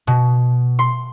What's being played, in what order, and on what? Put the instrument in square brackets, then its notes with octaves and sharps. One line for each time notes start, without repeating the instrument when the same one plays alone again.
[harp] B2
C6